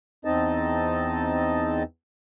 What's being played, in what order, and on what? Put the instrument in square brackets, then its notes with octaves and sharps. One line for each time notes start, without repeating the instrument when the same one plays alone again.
[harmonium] E2 C4 D#4 D#5 A5